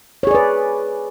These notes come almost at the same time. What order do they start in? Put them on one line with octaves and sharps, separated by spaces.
C#5 G#4 D5 B4